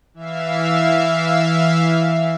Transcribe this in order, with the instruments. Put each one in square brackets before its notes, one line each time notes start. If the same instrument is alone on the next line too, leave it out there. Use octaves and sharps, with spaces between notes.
[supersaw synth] E3 E5 F5